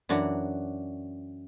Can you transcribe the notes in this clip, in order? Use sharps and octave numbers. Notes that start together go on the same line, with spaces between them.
F#2 E3 D4 F#4 A#5